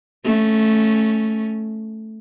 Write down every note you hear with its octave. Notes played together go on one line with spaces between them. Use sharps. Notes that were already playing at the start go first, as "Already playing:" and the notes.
A3 C#4